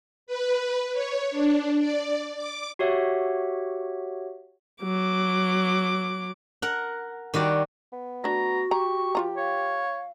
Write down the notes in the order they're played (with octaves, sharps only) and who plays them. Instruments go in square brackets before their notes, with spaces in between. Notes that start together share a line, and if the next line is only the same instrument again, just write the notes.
[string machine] B4
C#5
D4
D5
D6
[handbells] F#4 G4 C#5 E5 F#5
[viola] F#3 D6
[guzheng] A#4 F#5
D#3 G3 F#4 D5
[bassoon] B3
[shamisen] A3 D4 [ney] F#4 [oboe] A#5
[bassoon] G4 [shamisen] A#5 [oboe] C#6
[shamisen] F3 F4 A#5
[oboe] C#5 [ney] F5